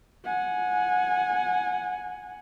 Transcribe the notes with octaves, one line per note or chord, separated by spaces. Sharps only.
F#5 G#5